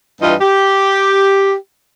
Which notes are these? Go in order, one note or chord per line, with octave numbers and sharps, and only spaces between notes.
G2 E3 F4 D#5
G4